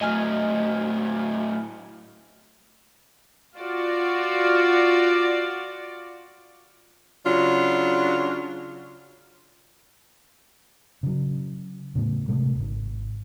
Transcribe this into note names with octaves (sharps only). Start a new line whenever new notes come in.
A2 F#3 D#5 G#5 F6
F4 F#4 D5
C#3 F#3 D4 F4
C#3 F#3
A2 C#3
C3 G#3 A3
D1 G#1